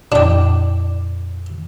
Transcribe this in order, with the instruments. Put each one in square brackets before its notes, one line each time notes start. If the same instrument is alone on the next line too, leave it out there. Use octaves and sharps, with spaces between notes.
[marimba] F2 A#2 D#5 [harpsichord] D4 G5